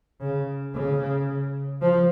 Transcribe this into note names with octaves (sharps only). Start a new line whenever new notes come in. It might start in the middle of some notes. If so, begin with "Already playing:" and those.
C#3
C#3
F3